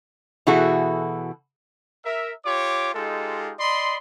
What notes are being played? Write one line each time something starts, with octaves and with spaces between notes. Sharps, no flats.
B2 E3 E4 F#4 G#4 A4
A#4 E5
F4 G4 C#5 D6
G#3 D#4 F4 G4 A4
D5 D#5 B5 C6